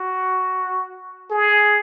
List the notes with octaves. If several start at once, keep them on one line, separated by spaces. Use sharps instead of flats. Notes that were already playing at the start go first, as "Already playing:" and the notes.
Already playing: F#4
G#4